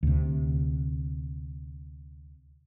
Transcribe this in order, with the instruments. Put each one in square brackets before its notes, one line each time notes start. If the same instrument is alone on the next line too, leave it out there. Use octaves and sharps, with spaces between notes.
[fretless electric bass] D2 C3